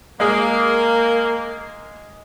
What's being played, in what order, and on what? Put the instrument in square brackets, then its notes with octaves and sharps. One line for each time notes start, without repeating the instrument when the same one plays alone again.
[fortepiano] G#3 G#4 [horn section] A#3